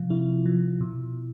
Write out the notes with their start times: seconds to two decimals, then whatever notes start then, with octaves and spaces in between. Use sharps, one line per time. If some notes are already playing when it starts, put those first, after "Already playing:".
Already playing: C3 F3 F4
0.10 C3 E4
0.46 F3
0.81 B2